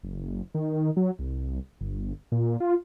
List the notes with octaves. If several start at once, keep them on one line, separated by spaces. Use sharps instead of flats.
F#1
D#3
F#3
C2
G1
A#2
F4